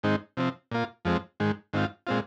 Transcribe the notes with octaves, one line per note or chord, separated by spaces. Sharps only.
G#2 D#3 G#3 C4 D#4
C3 F3 C4
A#2 A#3 F4
F2 F3 G#3 C4
G#2 D#3 G#3
G#2 D#3 C4 F4
A#2 G#3 C4 F4